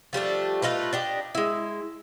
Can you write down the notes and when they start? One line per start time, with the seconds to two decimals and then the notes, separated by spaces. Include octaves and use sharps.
0.13 F3 G3 A3 D4
0.62 A3 D#4 F4 B4
0.93 D4 G4 D#5
1.35 G#3 E4